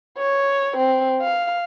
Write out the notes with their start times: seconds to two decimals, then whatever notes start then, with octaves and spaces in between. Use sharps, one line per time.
0.18 C#5
0.77 C4
1.22 F5